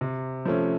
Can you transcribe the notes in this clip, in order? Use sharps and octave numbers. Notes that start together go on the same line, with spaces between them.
C3
F3 A3 C#4